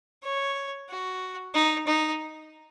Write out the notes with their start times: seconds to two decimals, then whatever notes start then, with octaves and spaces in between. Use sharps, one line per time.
0.23 C#5
0.89 F#4
1.54 D#4
1.87 D#4